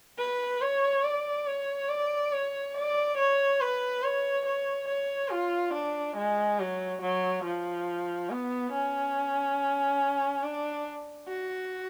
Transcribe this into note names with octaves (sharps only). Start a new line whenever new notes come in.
B4
C#5
D5
C#5
D5
C#5
D5
C#5
B4
C#5
C#5
C#5
F4
D4
G#3
F#3
F#3
F3
B3
C#4
D4
F#4